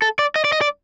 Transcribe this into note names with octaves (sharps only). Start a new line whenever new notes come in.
A4
D5
D#5
D5
D#5
D5